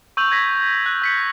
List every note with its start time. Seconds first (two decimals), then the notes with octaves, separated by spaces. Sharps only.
0.17 C#6 E6 G6 F7 F#7
0.31 C#6 G#6 A#6 B6
0.86 F#6
1.02 E6 B6 C#7